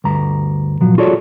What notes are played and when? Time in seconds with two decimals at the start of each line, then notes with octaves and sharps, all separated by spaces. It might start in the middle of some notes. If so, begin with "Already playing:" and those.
0.04 D2 G2 A#5
0.81 A#2 F3 F#3
0.98 F4 F#4 G#4 A4 C#5 D5